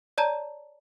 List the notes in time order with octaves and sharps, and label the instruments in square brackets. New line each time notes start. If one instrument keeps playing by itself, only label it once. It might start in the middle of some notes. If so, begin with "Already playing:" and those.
[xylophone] C#5 D5 A5 A#5 G6 D#7